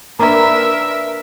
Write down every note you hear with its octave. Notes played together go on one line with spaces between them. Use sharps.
A#3 D4 A#4 B4 E5 A#5